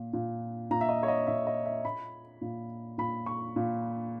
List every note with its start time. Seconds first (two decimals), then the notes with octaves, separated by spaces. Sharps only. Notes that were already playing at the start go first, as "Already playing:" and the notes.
Already playing: A#2
0.13 A#2
0.71 A#2 A#5
0.81 E5
0.89 D#5
1.03 C#5
1.08 D#5
1.27 A#2 E5
1.47 D#5
1.66 E5
1.85 A#2 B5
2.41 A#2
2.98 A#2 B5
3.26 C#6
3.56 A#2